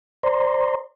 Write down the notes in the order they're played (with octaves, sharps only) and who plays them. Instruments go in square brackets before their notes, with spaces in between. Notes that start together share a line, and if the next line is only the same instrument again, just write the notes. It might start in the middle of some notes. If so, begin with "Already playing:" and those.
[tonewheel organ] C5 D5 A#5 C6